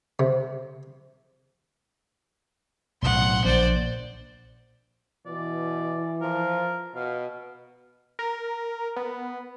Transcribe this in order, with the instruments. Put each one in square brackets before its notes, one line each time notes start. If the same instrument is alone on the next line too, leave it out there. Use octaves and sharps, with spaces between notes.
[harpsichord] C3
[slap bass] B1 A2 C#3 [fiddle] F#5 C6
[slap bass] A#1 [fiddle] C5 D5
[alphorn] B2 [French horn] E3 [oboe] D5
[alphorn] F3 [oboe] A#4
[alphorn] B2 [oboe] F5
[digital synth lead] A#4
B3